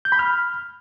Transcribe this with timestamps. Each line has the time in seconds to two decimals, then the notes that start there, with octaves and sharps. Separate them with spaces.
0.05 G6
0.12 B5
0.19 F6